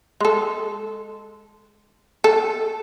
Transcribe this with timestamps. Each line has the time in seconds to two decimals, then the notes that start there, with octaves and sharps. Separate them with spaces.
0.21 G#3 A4
2.24 A4